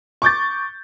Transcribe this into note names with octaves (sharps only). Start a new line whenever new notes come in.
C#6 D6 G6 A6